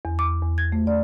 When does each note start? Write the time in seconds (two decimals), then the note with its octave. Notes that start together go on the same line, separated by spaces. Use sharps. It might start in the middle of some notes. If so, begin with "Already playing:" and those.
0.05 E2
0.19 D6
0.42 E2
0.58 G#6
0.72 A3
0.87 D5